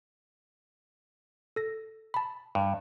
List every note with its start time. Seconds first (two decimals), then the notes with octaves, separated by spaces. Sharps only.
1.56 A4 A#6
2.14 A5 B5
2.55 G2